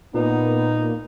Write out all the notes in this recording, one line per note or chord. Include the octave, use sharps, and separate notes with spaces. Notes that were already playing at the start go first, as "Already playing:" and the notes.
A#2 A#3 B3 D#4